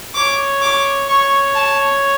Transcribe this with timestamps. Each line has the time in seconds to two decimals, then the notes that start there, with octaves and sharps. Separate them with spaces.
0.14 C#5 D6
0.62 D6
1.09 C#5 C#6
1.56 A5